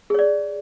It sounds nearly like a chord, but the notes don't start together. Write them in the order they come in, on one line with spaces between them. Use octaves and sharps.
G#4 C#5 D5